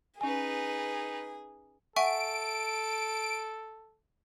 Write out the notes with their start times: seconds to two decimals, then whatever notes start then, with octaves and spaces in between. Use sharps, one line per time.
0.21 C#4 D#4 G#4 B4 G#5
1.96 A4 E5 F#5 G#5 C#6 D7